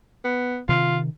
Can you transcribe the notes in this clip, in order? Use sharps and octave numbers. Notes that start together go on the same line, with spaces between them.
B3
C3 D#3 F4